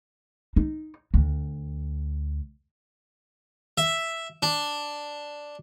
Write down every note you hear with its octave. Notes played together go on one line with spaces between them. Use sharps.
D#4
D2
E5
D4